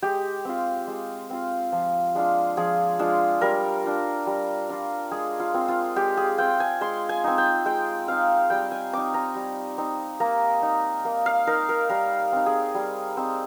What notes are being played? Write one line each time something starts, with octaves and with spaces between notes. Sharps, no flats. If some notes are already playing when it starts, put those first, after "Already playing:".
G#3 G4
C4 F4
G#3
C4 F4
F3
G#3 D4 F4
F3 G#4
G#3 D4 F4
G3 A#4
D4 F4
G3
D4 F4
G#3 G#4
F4
C4 F4
F4
G#3 G4
G#4
C4 F4 G5
G#5
G#3 C6
G#5
C4 D#4
G5
G#3 G5
C4 D#4 F5
G3 G5
G#5
C4 D#4 D6
A#5
G3
C4 D#4
A#3 A#5
D#4
A#3
F5
D#4 A#4
A#4
G3 A#4
C4 D#4
G#4
G3
C4 D#4